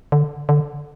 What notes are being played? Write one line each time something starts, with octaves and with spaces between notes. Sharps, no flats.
D3
D3